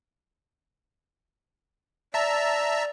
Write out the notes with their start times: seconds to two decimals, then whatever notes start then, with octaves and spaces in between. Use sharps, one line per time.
2.14 D5 E5 A5 A#5